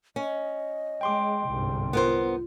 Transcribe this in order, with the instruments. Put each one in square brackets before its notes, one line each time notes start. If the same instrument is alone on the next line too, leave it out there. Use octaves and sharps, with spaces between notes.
[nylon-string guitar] C#4 [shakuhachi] D#5
[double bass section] G#3 [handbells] G5 C6 D6
[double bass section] G1 C2 G#2
[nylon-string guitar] B3 A#4 C5 [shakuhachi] F4